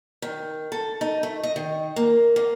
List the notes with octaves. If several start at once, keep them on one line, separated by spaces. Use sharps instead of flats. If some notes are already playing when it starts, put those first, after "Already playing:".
D#3
A4
D#4
A3
D#5
D#3
A#3
A#3